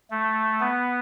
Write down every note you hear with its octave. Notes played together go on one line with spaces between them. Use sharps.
A3
B3